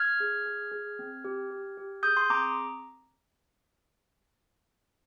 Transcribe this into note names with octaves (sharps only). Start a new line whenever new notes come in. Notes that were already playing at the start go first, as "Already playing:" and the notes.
Already playing: F6 G#6
G#4
G#4
G#4
C4
G4
G4
G4
G#4 D#6 G6
C6 D#6
C4 A#5 D6